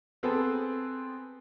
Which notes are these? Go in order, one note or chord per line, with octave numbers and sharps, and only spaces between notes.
B3 C4 G#4 A4 B4